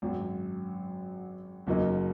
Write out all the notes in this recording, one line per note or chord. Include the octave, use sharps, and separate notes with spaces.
G#1 F#2 F#3
F#1 F#2 F#3 A#3 D#4